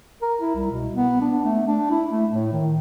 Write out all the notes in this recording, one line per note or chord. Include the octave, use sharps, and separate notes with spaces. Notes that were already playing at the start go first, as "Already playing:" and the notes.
A#4
E4
C2
B2
B3
D4
A3
D4
E4
A3
A2
D#3